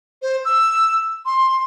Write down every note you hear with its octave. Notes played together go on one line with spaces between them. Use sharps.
C5
E6
C6